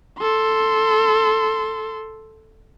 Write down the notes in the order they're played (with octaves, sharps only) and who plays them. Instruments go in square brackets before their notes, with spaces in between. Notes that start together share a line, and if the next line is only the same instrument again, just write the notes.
[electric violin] A4 C6